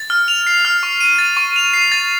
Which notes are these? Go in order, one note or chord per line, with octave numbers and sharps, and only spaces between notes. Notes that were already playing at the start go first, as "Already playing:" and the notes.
Already playing: A6
F6
F7
C7
F6
C#6
D#7
A6
C#6
F7
C7
A6